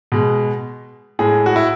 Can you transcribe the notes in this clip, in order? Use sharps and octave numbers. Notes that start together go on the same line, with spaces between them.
B2 G#3
A2 G#3 G#4
F#4
E4